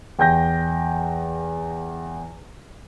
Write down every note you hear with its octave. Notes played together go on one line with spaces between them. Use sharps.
E2 G5 G6 A#6